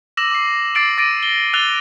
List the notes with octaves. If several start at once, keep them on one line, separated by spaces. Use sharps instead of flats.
D6 E6 A#6 E7 F#7
D6 C7
D6 E6 A6 C7 D7 F#7
D6 A6 A#6 D7 D#7
G7
E6 F#6 A6 F7 G7